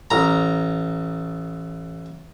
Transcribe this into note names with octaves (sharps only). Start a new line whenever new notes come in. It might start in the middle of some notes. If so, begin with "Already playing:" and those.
A1 A#5